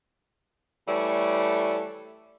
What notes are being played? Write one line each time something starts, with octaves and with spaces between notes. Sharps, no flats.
E3 G3 A3 A4 C#5